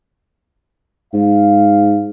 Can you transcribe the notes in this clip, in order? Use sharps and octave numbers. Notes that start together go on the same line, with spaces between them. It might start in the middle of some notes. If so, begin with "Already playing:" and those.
G#2 F5